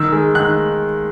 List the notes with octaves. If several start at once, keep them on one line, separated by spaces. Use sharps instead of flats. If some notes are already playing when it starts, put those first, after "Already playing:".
Already playing: D#3 E6
G#3
D#3 F#6